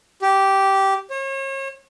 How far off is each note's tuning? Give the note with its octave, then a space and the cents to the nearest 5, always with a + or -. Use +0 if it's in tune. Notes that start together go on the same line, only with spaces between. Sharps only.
G4 -10
C#5 -40